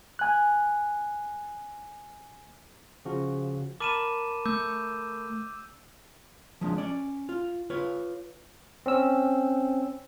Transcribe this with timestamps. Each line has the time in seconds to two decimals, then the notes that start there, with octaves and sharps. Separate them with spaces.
0.19 G#5 F#6
3.05 C#3 F3 F#4
3.80 A#4 A5 B5 D6 D#7 E7
4.45 A3 D6 E6 G6
6.61 F3 G#3 D4
6.78 C#4 D5
7.29 F4
7.70 F4 B4 C#5
8.86 C4 C#4 E6